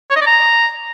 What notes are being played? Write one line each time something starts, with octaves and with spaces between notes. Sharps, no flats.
C#5
D#5
D5
A#5